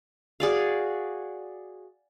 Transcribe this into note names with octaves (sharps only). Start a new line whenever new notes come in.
F#4 G#4 D5 F5